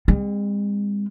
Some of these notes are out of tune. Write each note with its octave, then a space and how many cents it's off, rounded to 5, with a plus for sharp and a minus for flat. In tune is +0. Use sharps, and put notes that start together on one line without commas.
G#3 -40 C4 +0